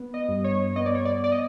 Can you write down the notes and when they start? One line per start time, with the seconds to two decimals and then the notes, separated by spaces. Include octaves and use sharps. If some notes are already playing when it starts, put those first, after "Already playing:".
Already playing: B3
0.14 D#5
0.29 G2
0.44 C#5
0.76 B3 D#5
0.86 D5
0.95 C#5
1.05 D5
1.24 D5
1.32 D#5